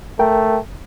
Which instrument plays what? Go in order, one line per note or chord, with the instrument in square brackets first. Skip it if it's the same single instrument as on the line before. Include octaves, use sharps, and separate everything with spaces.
[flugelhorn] A3 [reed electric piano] A#4 G5